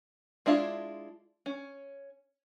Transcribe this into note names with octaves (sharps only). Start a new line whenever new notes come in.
G#3 D4 E4 F4
C#4